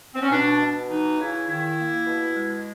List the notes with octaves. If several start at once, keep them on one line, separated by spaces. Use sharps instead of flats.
C4
C#4
B2 D4
B2
E3 D#4
C#3 E4
D#3 E4
A#3
B2
G#3